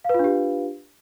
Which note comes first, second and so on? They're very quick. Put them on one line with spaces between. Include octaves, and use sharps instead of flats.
F5 B4 F4 D4 G4